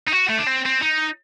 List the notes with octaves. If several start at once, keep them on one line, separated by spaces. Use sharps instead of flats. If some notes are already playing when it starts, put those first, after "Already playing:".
D#4
F#4
A3
D4
C4
C4
D#4